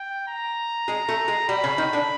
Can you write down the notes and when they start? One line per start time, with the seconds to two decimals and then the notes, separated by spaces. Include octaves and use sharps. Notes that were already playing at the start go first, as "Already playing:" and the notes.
Already playing: G5
0.28 A#5
0.88 G#3 G#4
1.08 A3 A4
1.28 G#3 G#4
1.49 G3 G4 B5
1.63 C#3 C#4
1.78 D#3 D#4
1.93 D3 D4